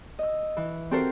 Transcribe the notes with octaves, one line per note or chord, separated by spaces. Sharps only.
D#5 E6
E3
C4 F#4 G4 A4 A#4 C5